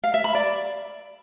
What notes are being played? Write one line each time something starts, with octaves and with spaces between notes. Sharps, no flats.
F5
E5
B5
D5